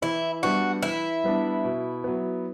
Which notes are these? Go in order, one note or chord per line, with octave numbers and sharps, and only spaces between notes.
E3 E4
G3 B3 D4 F#4
E3 E4
G3 B3 D4
B2
F#3 B3